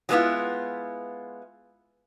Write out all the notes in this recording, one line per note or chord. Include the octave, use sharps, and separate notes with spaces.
F#3 G#3 A3 B3 E4 F4